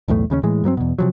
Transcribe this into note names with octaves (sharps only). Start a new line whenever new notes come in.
B1 E2 A2 A3
D#2 C#3 E3 C#4
A2 E3 G#3
G2 F#3 B3 C4
E2 B2
C3 F3 F#3